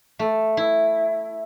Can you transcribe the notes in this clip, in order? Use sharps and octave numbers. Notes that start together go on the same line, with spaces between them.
A3
E4